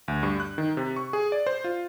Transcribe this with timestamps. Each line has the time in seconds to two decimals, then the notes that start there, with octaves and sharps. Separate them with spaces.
0.08 D2
0.23 G2
0.40 F#6
0.58 D#3
0.77 C3
0.96 C#6
1.13 G#4
1.32 D5
1.47 C5
1.64 F4